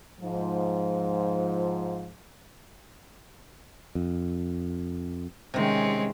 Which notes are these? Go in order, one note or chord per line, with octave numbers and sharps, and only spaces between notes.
G#2 F3
F2
C3 D#3 G#3 C4 C#4